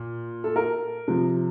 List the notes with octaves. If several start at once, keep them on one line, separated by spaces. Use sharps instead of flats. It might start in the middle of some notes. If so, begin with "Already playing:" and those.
Already playing: A#2
A4
A#4
C3 F3